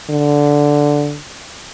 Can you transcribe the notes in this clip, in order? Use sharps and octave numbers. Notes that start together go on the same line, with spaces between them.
D3